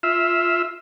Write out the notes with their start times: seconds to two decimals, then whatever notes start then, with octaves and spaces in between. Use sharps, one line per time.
0.03 F4 E5